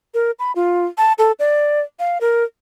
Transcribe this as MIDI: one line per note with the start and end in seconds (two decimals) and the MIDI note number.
0.14 0.31 70
0.39 0.52 83
0.56 0.86 65
0.98 1.13 81
1.19 1.32 69
1.39 1.81 74
1.99 2.18 77
2.21 2.44 70